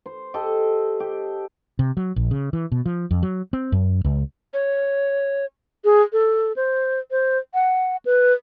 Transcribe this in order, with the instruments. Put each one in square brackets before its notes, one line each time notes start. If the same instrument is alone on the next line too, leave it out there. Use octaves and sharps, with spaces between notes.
[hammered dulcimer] C5
G4 A4 D#5
G4
[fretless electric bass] C3
F#3
A#1
C#3
E3
B2
F3
F2
F#3
C4
F#2
C#2
[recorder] C#5
[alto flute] G#4
A4
C5
C5
F#5
B4